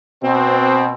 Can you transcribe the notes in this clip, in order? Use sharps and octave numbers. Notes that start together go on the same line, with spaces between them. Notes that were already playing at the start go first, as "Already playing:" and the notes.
B2 C4